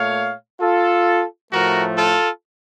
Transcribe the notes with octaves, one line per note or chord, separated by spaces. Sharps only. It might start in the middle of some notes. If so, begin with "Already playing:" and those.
Already playing: A#2 A3 C#5 F5
F4 A4
A2 F3 A3 F#4 A#4
F4 A4